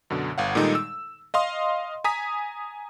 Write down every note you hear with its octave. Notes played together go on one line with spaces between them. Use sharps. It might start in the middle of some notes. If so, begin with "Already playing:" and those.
F#2 B2 D3
G1 F5 F#5
A#2 D#3 G3 G#3 D#4 A4
E6
D#5 F5 C6 D#6
G#5 A#5 D#6 B6